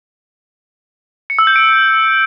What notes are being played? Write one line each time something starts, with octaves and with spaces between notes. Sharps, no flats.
C#7
E6
G6
D7